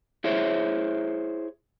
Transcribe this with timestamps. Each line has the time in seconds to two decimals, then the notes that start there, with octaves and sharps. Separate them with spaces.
0.24 E4 G#4 C5 C#5 E5